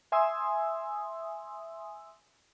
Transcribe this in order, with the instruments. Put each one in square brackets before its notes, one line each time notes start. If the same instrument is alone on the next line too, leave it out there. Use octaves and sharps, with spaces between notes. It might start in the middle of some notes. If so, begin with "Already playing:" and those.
[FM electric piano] E5 G#5 C6 D#6 E6